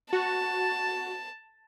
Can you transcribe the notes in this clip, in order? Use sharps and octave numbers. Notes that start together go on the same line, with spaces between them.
F#4 A5